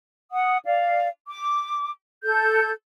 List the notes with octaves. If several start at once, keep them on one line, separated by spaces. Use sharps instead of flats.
F#5 D#6
D5 F5
D6
A4 G6